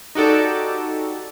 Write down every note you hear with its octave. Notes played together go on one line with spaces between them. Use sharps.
D#4 F#4 G4 A4 D5